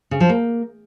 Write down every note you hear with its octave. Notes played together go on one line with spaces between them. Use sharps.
C#3
F3
A#3